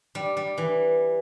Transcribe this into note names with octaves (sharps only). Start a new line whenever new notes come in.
G3
G3
E3